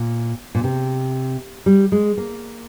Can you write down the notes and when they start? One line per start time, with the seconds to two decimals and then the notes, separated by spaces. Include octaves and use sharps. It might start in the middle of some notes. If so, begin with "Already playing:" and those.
Already playing: A#2
0.55 A#2
0.64 C3
1.66 G3
1.92 G#3
2.17 A#3